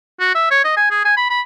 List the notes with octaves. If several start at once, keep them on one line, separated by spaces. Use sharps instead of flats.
F#4
E5
C#5
D#5
G#5
G#4
G#5
B5
B5